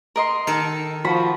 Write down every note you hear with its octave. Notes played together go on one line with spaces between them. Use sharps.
A#4 D#5 C6
D#3 A4 A#4 A5
F3 F#4 B5